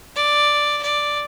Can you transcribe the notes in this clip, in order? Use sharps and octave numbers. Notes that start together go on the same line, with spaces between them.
D5
D5